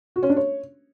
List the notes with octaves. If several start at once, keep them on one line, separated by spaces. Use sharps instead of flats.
F#4
C#4
D4
C#5